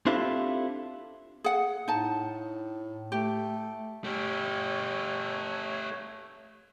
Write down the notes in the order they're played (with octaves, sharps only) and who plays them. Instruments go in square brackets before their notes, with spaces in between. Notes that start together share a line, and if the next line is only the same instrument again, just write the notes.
[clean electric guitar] C4 D4 E4 F4 G4 A4
[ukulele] G#4 F#5
[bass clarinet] A2 [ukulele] D#4 A5
[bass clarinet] A3 [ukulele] G4
[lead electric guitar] A3 G4 [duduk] C#5